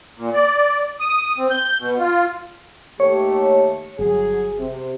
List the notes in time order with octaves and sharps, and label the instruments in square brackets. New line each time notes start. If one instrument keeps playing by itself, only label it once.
[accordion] A#2
D5
D#6
C4
G6
B2
F4
[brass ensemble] D#2 A3 G4 [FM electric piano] C#5
[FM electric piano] G1 [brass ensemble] F#3 G#4
[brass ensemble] C3